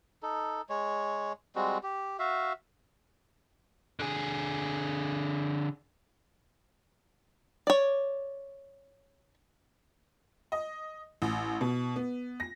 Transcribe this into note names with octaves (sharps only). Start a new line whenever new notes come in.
D#4 A4
G#3 C#5
G3 G#3 C4 F#4
G4
F#4 E5 F5
D3 G#4
C#5 D5
D#5
A1
B2
B3
A#6